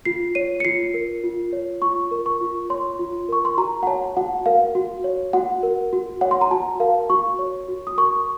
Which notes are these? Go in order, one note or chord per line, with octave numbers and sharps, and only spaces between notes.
F4 C7
C#5 D#7
C#7
F4 C7
A#4
F4
C#5
F4 C#6
A#4
C#6
F4
C#5 C6
F4
A#4 C#6
C6
F#4 A#5
F#5
C#5 A5
F#4 F#5
A#4 F5
F#4
C#5
F#4 F#5
A#4
F#4
C#5 F#5
C6
A#5
F#4 A5
A#4 F5
F#4 C#6
C#5
F#4
D#6
A#4 C#6